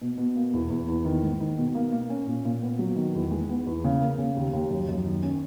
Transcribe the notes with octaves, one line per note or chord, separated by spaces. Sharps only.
B2
B2
A#3
E2
E2
E2
D#3
G#2
D#3
B2
A#3
A#3
C#4
A#2
A#2
B3
F#3
D#3
E2
G#3
B3
E2
C#3
A#3
C#3
D#2
D#2
F#2
F#2
D#3
C#4